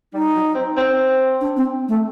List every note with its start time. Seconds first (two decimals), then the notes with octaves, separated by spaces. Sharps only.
0.13 G3 D#4
0.35 F#3
0.55 C4
0.77 C4
1.41 D4
1.56 C4
1.88 A3